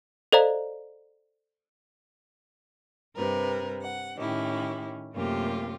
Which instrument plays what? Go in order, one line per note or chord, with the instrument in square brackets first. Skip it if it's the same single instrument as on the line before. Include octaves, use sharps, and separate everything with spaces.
[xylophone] A4 C5 D5 D#5 F5 A#5
[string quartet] G2 C3 A#4 B4
F#5
A2 D#3 C#4 E4 G4
F#2 C3 A3 A#3 F4 G4